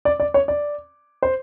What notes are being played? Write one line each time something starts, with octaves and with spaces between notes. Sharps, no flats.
D5
D5
C#5
D5
C5